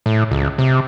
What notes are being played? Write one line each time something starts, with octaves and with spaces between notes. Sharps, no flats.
A2
C#2
C3